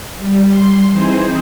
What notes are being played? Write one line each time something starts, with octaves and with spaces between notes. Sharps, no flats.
G3
C6
E3 C4 D#4 G#4 C5